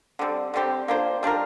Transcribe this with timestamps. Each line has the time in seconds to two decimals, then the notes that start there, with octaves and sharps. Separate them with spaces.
0.19 D3 G3 C4
0.54 D3 G3 C4 G4
0.88 A#3 D4 F4 C5
1.23 G3 D4 F4 A#4